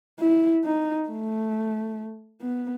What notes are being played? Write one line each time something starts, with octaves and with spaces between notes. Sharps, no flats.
E4
D#4
A3
B3